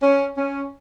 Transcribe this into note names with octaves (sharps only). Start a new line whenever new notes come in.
C#4
C#4